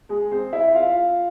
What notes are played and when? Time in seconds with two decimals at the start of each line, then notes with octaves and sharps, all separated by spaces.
0.09 G#3 G#4
0.32 C4 C5
0.53 E4 E5
0.75 F4 F5